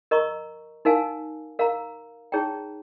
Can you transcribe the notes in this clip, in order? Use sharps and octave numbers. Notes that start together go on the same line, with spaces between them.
A#4 D#5 A#5 C#6
D#4 A#4 F5 G#5
A#4 F5 A#5
D#4 G#4 C#5 G5 A#5